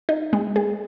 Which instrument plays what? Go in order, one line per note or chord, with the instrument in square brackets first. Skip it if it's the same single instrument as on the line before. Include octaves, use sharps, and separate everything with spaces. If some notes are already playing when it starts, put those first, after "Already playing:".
[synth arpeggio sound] D#4
G#3
G#4